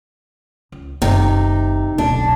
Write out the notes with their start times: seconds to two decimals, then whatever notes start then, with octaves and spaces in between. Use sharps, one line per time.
0.72 C#2
1.02 F#1 D#2 C3 D#4
1.98 D1 B1 D4